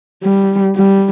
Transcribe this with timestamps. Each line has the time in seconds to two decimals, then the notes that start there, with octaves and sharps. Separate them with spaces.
0.23 G3
0.75 G3